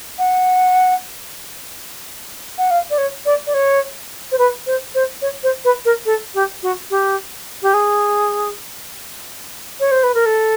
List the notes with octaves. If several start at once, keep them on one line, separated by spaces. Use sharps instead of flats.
F#5
F#5
F5
D5
C#5
D5
D5
C#5
C5
B4
C5
C5
C#5
C5
B4
A#4
A4
G4
F#4
G4
G4
G#4
C#5
C5
B4
A#4
A4